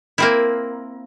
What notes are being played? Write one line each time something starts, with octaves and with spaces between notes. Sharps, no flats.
A#3 C4 E4